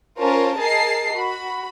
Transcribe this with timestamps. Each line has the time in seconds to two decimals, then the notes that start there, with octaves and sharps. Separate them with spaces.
0.18 C#4 F4 A#4 C5 A5
0.57 G#4 A#4 D#5 A5 C7
1.14 F#4 B5